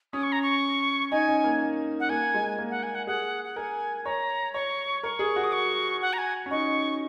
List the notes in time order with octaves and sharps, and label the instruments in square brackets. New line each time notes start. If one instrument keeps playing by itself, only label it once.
[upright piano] C#4 [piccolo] D#6
[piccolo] C#6
A#5
C#6
[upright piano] D#4 [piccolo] G#5
[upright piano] C#4
A#3
[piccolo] F#5
[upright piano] A#3 [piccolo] G#5
[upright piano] G#3
A#3
[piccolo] F#5
G#5
F#5
[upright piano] G#4 [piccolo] F#5
[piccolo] F#5
[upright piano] A#4 [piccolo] G#5
[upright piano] C#5 [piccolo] A#5
[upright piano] C#5 [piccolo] C#6
[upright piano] A#4 [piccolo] C#6
[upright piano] G#4
F#4
[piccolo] D#6
C#6
F#5
A#5
G#5
[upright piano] C#4
[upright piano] D#4 [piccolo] C#6